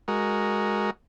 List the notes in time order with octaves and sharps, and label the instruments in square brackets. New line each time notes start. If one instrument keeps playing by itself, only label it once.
[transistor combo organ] G#3 F#4 A#4